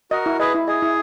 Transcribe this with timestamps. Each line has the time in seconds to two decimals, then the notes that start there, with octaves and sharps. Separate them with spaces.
0.11 F#4 A#4 D#5
0.26 E4
0.40 G#4 B4 D#5
0.54 E4
0.68 G#4 D#5
0.82 E4